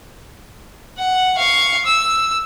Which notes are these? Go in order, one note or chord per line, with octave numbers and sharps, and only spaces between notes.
F#5
F5 C#6
E6